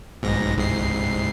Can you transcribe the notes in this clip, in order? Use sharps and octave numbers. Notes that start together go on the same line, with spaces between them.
B1 G#2 A#6
C2 G#2 C7